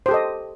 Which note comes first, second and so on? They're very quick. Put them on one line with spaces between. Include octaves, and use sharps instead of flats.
C5 G4 A4 D#5